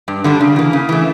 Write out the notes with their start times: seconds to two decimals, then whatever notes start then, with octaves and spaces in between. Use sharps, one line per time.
0.08 G2
0.24 D3 G3 D4
0.41 C#3
0.56 E3 A#3
0.73 C#3
0.89 E3 A3